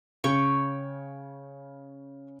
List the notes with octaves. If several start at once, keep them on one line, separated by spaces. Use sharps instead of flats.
C#3 C#5 G5 C#6